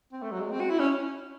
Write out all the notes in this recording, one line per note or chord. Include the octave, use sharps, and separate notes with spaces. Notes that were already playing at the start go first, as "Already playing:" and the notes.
C4
A3
F#3
G#3
C4
F#4
E4
C#4